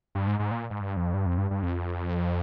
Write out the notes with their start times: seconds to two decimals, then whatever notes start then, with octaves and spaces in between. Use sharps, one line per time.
0.15 G2
0.27 G#2
0.39 G#2
0.51 A#2
0.70 G#2
0.81 G2
0.97 F2
1.14 G2
1.26 F2
1.38 G2
1.51 G2
1.63 F2